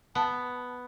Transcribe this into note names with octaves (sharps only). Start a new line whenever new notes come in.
B3 A5